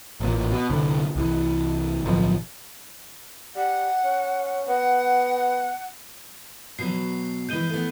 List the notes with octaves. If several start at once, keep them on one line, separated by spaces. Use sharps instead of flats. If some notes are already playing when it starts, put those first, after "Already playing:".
A1 A#2
B2
C2 G2 D3
C2 E3
D1 B1 F3
G3 F#5
C#4
B3 F#5
B2 F#3 C7
E3 G#3 G6 D#7 G7
A3 B3